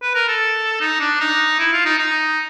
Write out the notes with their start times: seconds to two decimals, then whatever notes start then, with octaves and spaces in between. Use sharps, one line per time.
0.02 B4
0.15 A#4
0.28 A4
0.81 D#4
1.00 D4
1.20 D#4
1.59 E4
1.73 F4
1.85 D#4
1.98 D#4